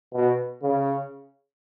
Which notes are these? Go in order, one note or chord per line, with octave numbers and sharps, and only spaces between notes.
B2
C#3